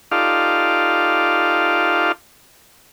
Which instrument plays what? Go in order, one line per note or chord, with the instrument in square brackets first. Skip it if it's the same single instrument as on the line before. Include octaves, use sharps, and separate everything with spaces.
[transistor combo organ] D#4 F4 G4 A4 D5 F5